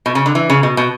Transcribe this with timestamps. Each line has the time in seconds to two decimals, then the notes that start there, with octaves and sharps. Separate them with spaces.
0.06 B2
0.15 C#3
0.26 D3
0.35 E3
0.50 C#3
0.63 B2
0.77 B2